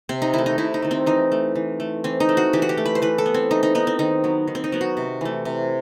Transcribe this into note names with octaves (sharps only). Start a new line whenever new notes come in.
C3 C4
D#4
D#3 A3 E4
D#4
C3 E4
D#4
D#3 A3
C4
E3 D#4
A3
E3
A3
E3 C4
D#4
A3
F#4
E3 G4
F#4
G4
A3
B4
C5
E3 B4
A4
B3
C4
E3 D#4
D#4
B3 D#4
C4
D#3 D#4
F#3 B3
D#3
C4
D#4
F#3 B3
F#4
C3
E3 A3
C3